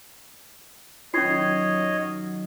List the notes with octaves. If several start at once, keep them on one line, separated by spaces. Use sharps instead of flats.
D#3 F#3 C#4 F4 C#5 D#5 G#6 C7